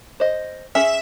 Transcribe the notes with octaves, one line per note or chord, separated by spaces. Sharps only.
C5 D#5
C#4 G#4 E5